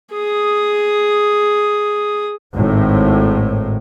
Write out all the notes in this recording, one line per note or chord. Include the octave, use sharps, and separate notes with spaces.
G#4 D#6
G#1 A2